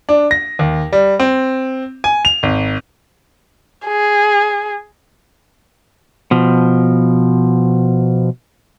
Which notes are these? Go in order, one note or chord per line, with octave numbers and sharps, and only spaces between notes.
D4
A#6
D#2
G3
C4
G#5
F7
G#1
G#4
B2 F3